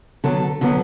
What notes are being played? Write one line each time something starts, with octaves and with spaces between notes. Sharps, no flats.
D3 F#3 B3 A4
D3 F#3 B3